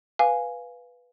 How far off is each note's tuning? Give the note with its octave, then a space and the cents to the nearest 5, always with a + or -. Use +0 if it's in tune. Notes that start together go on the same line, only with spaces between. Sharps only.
B4 +0 F5 +0 G#5 +0